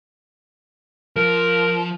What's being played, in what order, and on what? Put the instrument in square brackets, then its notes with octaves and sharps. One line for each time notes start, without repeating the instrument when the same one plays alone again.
[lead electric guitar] F3 [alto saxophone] A#4